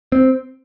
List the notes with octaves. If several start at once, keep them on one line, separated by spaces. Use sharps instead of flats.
C4